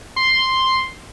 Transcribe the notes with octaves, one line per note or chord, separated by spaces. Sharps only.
C6